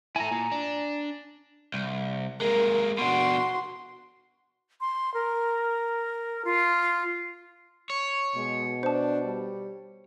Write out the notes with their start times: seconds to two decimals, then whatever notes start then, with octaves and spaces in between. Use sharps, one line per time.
0.16 E4 A4 G#5 A#5
0.32 A#2
0.52 D4
1.74 C2
2.41 G#3 A#3 A#4
2.98 B2 D4 F#4 C6
4.81 C6
5.14 A#4
6.45 F4
7.90 C#5
8.36 B2 G#3
8.83 D4 C5 A5
9.24 G3